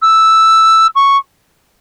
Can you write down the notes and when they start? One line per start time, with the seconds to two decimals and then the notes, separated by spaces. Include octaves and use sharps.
0.02 E6
0.95 C#6